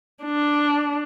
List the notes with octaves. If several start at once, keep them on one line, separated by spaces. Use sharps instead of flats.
D4